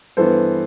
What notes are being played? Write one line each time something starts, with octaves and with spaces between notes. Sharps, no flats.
G2 E3 B3 A4 C5